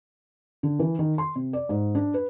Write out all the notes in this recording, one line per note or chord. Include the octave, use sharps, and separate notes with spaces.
D3
E3
D#3
C6
C3
D5
G#2
D4
B4